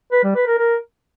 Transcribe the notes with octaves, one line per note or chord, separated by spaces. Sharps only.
B4
G3
B4
A#4
A#4